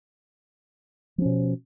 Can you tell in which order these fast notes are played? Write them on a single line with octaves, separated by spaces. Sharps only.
F3 C#4 B2